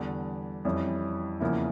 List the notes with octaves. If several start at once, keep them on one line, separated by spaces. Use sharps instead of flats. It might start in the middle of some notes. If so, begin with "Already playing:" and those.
Already playing: E2 D3 G3 D4
F2 E3 G3 C#4 E4
E2 C#3 F3 A#3 E4